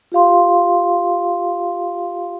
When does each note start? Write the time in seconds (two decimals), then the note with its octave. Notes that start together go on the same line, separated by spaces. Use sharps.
0.12 F4 G4 F5 C6